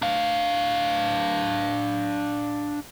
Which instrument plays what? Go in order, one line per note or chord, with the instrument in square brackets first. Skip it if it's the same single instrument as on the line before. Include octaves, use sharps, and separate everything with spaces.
[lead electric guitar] D4 F5